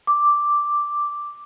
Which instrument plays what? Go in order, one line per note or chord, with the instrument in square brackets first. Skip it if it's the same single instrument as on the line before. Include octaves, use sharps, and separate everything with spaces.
[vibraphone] D6